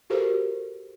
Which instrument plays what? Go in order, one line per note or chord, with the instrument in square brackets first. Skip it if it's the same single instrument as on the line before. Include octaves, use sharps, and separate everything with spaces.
[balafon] F#4 G4 A4 A#4 C5